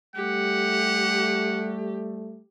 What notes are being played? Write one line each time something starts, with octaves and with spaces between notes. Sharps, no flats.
G3 A3 G4 F#5